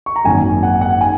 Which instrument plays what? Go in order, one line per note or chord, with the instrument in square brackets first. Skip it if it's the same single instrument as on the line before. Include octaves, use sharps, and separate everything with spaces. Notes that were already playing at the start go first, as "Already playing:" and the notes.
[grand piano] C#6
A#5
G#1 F#2 D#3 A#3 C#4 G#5
F#5
F#5
G#5